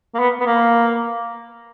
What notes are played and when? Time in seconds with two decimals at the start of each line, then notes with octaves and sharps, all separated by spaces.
0.14 A#3
0.19 B3
0.40 B3
0.46 A#3